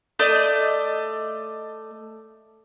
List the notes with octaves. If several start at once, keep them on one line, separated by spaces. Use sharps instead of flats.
A3 D5 D#5